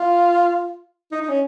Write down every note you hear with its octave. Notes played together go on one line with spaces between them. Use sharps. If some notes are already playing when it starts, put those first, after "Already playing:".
Already playing: F4
D#4
D#4
C#4